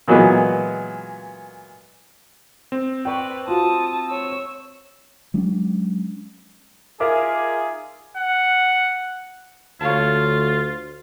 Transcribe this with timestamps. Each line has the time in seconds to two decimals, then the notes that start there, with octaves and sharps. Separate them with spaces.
0.08 A#2 E3 F#3 G#3 B3
2.72 C4
3.05 B4 D5 G5 C#6
3.48 F4 F#4 A5 D#6
4.10 C#5 E6
5.34 F#3 G#3 C#4 D4
7.00 D#4 F4 G#4 A#4 E5 D6
8.17 F#5
9.81 D2 F4 C#5 F5 A5